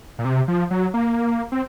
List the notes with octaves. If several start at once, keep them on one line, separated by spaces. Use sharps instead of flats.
A#2
C3
F3
F#3
A#3
C4